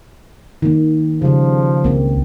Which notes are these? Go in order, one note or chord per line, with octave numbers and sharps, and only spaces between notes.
D#3 A#3
C#3 F3 G3
C#2 A#3 C4